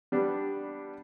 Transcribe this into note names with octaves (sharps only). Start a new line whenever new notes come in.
G3 B3 D4